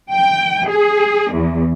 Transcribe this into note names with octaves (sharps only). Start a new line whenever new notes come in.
G5
G#4
E2